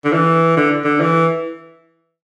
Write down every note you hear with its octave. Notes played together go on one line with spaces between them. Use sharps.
D3
E3
D3
D3
E3